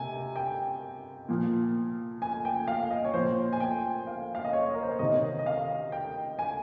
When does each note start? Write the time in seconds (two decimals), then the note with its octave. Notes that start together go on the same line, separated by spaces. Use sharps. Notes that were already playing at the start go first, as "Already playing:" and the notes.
Already playing: C3 G#5
0.36 G5
1.29 A#2 F3
2.22 G#5
2.45 G5
2.68 F5
2.90 D#5
3.04 C#5
3.14 A#2 F3 C5
3.53 G#5
3.60 G5
4.07 F5
4.35 F5
4.44 D#5
4.53 C#5
4.74 A#4
4.83 C5
4.91 C#5
4.99 C3 D#3 D#5
5.39 D#5
5.46 F5
5.92 G5
6.39 G#5